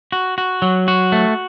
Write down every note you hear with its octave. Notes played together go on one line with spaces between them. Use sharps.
F#4
F#4
F#3
F#4
A3